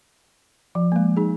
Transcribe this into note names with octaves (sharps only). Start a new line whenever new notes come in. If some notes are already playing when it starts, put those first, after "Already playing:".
F3
A#3
G#3
D#4 G#4